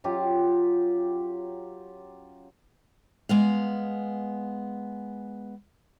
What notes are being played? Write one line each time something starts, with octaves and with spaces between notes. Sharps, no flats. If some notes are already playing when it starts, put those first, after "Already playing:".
F#3 C#4 F4 G4
G#3 B3 F5